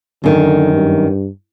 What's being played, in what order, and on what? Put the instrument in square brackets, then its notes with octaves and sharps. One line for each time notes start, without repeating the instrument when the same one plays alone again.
[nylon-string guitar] F#2 D#3 [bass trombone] D3
[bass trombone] G2